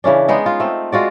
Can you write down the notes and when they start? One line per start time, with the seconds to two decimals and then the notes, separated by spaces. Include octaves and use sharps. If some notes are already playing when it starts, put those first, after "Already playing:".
0.04 C#3 E3 C#4 D4
0.28 G#3 B3 D#4
0.46 F4
0.60 A3 C4
0.92 G#3 F4 F#4 D5